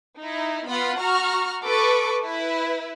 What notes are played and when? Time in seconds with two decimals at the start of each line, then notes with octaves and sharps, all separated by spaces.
0.19 D#4 E4
0.67 B3 F4 F#5 B5
0.98 F#4 A#5 C#6 F6
1.64 A4 B4 C#6 D6
2.20 E4 B4